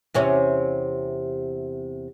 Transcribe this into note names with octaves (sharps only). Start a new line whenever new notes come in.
E2 C3 C#4